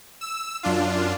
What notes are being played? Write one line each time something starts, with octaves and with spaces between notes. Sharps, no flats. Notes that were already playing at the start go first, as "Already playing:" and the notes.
E6
F#2 D4 F4